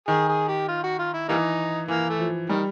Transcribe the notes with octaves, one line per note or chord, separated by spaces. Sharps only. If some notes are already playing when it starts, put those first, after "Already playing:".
D#3 G#4
G#4
G4
F4
F#4
F4
E4
E3 G3 A#3 D#4
E3 A#3
A3
F3
D#3 G3